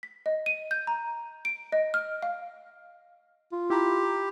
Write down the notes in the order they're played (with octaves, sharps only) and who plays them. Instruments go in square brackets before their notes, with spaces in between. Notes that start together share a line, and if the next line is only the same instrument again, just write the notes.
[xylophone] B6
D#5
D#7
G6
A#5
D7
D#5
F6
F5
[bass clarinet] F4
[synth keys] E4 A#5 B5 [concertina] G4